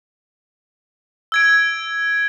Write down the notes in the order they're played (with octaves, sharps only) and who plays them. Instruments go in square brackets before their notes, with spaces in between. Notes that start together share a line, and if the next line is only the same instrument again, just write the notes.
[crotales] E6 G#6 D7